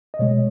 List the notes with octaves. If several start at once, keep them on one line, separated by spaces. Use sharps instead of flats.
D#5
B2 G#3 C#5